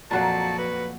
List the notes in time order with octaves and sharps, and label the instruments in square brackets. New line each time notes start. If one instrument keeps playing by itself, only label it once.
[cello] F2 F#4 [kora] A#2 F#3 A#3 [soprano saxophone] A5
[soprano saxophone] B4